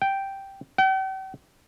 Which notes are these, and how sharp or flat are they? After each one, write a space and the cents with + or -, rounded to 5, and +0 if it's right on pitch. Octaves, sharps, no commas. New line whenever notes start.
G5 -5
G5 -45